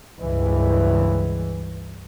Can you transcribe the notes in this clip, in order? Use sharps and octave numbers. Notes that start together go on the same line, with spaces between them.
C#2 G2 E3